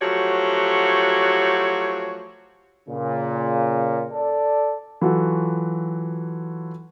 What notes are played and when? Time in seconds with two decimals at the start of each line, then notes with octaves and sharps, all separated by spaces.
0.01 F3 F#3 A3 F#4 G4 C#5
2.89 A#2 C#3
4.12 A4 D5
5.01 E3 F#3 F4 F#4 A4